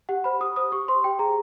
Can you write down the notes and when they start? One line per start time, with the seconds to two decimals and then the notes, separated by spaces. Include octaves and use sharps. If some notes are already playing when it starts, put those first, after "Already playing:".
0.09 G4 F#5
0.24 C5 B5
0.40 G4 D#6
0.56 C5 D#6
0.72 G4 C#6
0.88 C5 C6
1.04 G4 G5
1.19 G#4 A#5